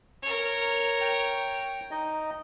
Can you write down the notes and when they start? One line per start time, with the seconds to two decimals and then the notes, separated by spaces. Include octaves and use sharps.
0.22 A#4 C#5
1.01 G5
1.91 D#4 D#5